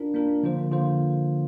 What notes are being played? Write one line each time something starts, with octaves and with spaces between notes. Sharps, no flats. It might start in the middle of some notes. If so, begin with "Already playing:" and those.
Already playing: D4 F4 A#4
A#3 D4 F4 A#4
D3 F3 A#3 F4 C5
D3 F3 A#3 F4 C5